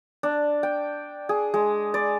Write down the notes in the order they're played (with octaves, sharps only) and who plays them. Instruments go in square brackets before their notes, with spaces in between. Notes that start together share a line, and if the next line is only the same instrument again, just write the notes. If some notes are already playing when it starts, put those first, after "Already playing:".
[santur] D4
G5
G#4
G#3
D5